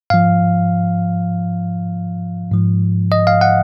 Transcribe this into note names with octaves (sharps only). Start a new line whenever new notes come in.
G#2 F3 F5
G#2 F3
D#5
F5
F#5